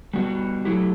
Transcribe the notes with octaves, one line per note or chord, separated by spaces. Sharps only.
G3 B3 F#4
F#3 A3 E4 G4